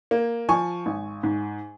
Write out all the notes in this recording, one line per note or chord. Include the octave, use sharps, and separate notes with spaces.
A#3
F3 G#5 C#6
G#1
G#2